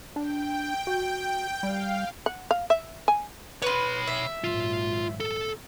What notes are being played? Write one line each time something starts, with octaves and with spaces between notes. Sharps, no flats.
D4 G5
F#4
G3 F5
F#5
F5
E5
G#5
B4 C#5 B5 C6
E5
G#1 A#2 F#3 F4
A4